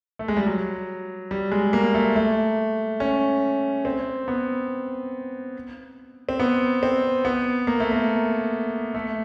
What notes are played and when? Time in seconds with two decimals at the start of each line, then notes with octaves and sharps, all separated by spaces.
0.19 A3
0.28 G#3
0.37 G3
0.46 F#3
1.31 G3
1.51 G#3
1.73 A#3
1.94 A3
2.16 A3
3.00 C#4
3.85 C4
4.28 B3
6.29 C4
6.40 B3
6.83 C4
7.25 B3
7.67 A#3
7.80 A3
7.92 A#3
8.94 A3